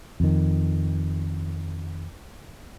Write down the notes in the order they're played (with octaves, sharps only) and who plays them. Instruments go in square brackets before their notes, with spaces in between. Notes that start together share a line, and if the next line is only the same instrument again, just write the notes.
[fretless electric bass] F2 D#3